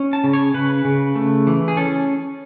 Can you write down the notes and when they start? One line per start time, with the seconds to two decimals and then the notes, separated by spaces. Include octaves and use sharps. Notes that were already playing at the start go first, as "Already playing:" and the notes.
Already playing: C#4
0.13 A5
0.24 C#3
0.33 C#5
0.54 C#3 B4
0.85 C#3
1.15 A3
1.47 E3
1.68 G#4
1.77 C#4 A4